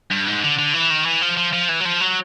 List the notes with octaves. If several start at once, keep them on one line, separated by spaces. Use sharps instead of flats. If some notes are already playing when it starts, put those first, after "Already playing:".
G2
G#2
D3
D3
E3
D#3
E3
F3
F3
F3
E3
F#3
F3
F#3